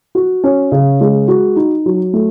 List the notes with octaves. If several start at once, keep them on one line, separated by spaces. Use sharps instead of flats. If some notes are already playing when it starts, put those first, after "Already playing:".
F#4
C#4
C#3
G#3
F#4
D#4
F#3
A3